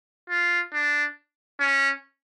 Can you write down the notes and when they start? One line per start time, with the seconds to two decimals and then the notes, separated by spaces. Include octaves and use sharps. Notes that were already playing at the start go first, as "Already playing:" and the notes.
0.30 F4
0.74 D4
1.60 C#4